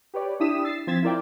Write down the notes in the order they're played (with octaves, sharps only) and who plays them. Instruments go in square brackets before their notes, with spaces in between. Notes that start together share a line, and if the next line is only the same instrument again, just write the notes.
[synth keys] G4 B4 C#5 D5
D4 E4 G4 D#6 B6 E7
E6 A6 C7
F3 C4 G#6 A6 B6 E7
E4 F4 A#4 D5 G5